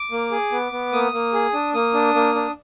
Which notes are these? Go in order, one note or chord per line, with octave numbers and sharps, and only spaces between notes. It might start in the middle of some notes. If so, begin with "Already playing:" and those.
Already playing: D6
A#3
G#4
B3
B3
A#3 D#6
A#3
G#4
D4
A#3 D#6
D4
A#3
D4